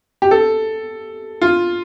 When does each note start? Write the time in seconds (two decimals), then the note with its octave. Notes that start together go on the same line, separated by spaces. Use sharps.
0.22 G4
0.31 A4
1.42 F4